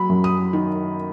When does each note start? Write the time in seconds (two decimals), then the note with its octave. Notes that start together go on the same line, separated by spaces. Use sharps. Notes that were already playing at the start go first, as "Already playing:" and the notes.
Already playing: F#3 B5
0.09 F#2
0.24 D#6
0.53 D#3